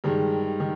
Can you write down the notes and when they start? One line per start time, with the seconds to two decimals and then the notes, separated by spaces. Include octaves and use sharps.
0.04 G2 D#3 G#3
0.60 D#3